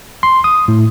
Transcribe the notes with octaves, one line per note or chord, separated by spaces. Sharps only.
C6
D#6
A2